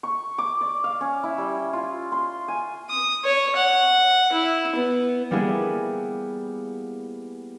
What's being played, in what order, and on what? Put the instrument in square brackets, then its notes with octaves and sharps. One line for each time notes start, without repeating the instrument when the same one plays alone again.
[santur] C#6
D6
D5
F5
C#4
E4
G3
F4
C6
G#5
[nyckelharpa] D#6
C#5
F#5
E4
B3
[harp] G3 A#3 B3 E4 G#4